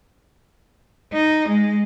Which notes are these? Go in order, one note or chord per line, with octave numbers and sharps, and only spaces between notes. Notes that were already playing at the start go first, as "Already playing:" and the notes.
D#4
G#3